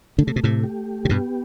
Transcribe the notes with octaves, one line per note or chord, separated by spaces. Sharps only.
D3 A3
C3
B2
A2 C3
G4
C3
G2 B2 B3